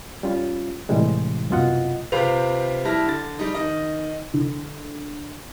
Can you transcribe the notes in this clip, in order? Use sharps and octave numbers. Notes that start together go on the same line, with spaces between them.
G3 C#4 F4
A2 C3 E3 G3 G#3
C2 F#2 B2 F4 D#5 F#5
C3 C4 F4 G4 B4 F7
G3 E4 A5 F6 A#6
D3 A6
G3 D#4
D#3 D#5
D3